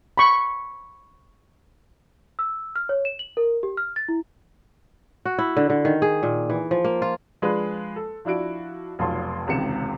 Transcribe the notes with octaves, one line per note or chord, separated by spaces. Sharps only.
B5 C#6
E6
F6
C#5
E7
F#7
A#4
G4
F6
A6
E4
F#4
E4
D3
D3
D#3
G#4
A#2
E3
F3
A#3
F4
F3 G#3 D4 G#4 B4
A4
F3 D4 E4 F#4 D7
F1 B1 F4 C#5 A5 C6
E1 C#2 C3 D#3 C#7 E7